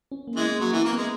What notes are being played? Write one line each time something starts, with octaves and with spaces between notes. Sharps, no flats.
C#4
A#3
E3 G#3
B3
F#3 A#3
E3 B3
A#3
G#3 B3